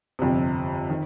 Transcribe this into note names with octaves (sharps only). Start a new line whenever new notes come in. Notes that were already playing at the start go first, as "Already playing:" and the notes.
G1 F2 C3
D#3